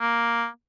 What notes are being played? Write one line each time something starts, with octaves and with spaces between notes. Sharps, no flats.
A#3